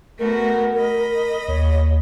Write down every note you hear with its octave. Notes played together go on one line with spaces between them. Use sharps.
A3 B3 F#4 A#4
D#5 B5
D#2 C#5